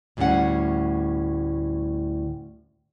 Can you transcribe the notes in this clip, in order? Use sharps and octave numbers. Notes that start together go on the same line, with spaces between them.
D2 A2 G3 G#3 C#4 F#5